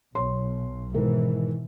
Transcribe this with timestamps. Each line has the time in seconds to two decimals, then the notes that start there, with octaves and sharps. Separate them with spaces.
0.15 B1 C#5 C6
0.94 G#2 B2 D#3 E3 A#4